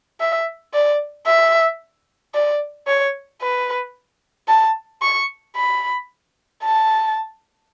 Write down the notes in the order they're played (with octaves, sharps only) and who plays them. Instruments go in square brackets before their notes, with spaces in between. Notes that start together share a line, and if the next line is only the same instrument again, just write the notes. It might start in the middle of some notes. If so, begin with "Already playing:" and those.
[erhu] E5
D5
E5
D5
C#5
B4
A5
C#6
B5
A5